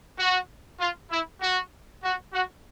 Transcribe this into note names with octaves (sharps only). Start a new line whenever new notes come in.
F#4
F4
E4
F#4
F#4
F#4